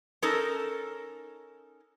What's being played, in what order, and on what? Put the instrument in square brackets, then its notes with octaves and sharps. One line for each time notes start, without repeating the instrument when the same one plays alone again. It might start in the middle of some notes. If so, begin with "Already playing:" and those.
[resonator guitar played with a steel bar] C#4 D#4 A4 A#4